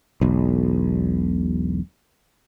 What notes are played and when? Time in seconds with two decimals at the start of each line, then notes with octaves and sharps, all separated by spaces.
0.21 E1 B1